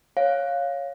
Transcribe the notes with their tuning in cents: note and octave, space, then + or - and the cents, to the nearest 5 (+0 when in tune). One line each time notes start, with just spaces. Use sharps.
C#5 +0 F5 +5